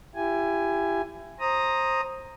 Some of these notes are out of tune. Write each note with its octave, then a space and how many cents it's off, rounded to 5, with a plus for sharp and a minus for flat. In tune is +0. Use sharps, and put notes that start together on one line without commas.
E4 +30 G4 +0 G#5 +0
C5 +20 A#5 +0 D#6 +0